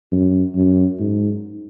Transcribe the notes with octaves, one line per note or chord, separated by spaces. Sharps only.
F#2
F#2
G#2